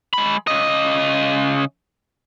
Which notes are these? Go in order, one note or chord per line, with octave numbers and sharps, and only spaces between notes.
G#3 B5
C#3 D#5